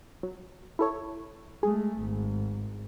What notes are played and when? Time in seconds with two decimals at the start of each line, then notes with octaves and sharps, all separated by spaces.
0.23 F#3
0.79 E4 A4 C#5
1.63 G#3 A3 G#4
1.99 G#1